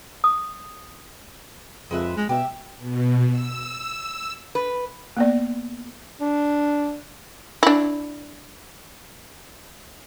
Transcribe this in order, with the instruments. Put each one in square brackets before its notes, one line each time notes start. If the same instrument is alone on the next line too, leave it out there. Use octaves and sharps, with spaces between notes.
[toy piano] D#6
[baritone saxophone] F2 [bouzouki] G#3 B4 E5
[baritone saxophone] G#3
[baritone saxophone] B2 [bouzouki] G4 E5
[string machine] B2
E6
[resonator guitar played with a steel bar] B4
[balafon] A#3 B3 D5
[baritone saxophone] D4
[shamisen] D4 E4